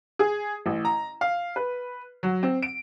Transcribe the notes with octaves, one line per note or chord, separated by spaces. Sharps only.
G#4
A1
A#5
F5
B4
F#3
C4
D7